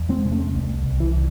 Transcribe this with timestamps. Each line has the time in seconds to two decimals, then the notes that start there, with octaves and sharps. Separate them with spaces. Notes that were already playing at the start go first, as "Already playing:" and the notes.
Already playing: E2
0.09 G#3 C4
0.25 C3
0.32 A3 C#4
0.55 C2
0.86 C2
1.00 E3